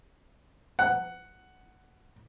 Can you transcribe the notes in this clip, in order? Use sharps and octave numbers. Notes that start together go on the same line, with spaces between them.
F#5